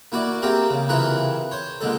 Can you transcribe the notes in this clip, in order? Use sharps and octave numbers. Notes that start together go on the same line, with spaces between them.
A#3 E4 F#4 D5
A#3 C4 G4 G#4 A#4
C#3
C3 E3 F4 G#4 A#4 B4
C5 C#5
A#2 D3 G#3 A4